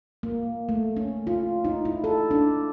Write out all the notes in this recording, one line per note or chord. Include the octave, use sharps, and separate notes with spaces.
A#3
A3
C#4
F4
D#4
E4
A4
D4